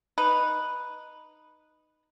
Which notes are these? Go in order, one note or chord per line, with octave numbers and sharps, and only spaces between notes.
D#4 B4